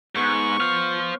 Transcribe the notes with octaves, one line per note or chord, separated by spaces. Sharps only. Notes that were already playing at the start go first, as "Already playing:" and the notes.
G#2 B3 C#6
C5 F5